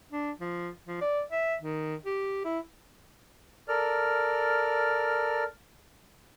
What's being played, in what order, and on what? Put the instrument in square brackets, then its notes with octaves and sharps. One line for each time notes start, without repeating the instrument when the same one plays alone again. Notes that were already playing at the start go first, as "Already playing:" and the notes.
[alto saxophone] D4
F3
F3
D5
E5
D#3
G4
E4
[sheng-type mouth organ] A4 A#4 D5 F6